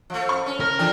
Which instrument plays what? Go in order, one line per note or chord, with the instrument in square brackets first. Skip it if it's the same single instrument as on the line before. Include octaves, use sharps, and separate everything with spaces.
[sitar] F3 A3
[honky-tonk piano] C#6
[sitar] C#4
[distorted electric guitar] A#4 [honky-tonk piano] F6
[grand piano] F3 D5 G5 [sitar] D4 A4